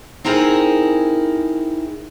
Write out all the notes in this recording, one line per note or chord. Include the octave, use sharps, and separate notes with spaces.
C4 D#4 E4 G#4 A#4